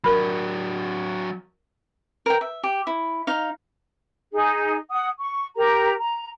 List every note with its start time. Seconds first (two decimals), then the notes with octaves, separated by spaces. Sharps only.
0.04 F#3 D4 A#4 B5
2.26 A#4 G5
2.41 E5
2.63 G4
2.87 E4
3.27 D#4 F5
4.32 D#4 G#4
4.90 F#5 D#6
5.19 C#6
5.55 G4 A#4 A#5
5.99 A#5